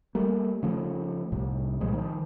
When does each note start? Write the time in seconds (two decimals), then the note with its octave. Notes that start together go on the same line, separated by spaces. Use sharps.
0.15 G3 A3 A#3
0.63 C#3 F3 A3
1.32 C2 A2 C3
1.81 C2 A#2 F3 G#3
1.93 D#3 F3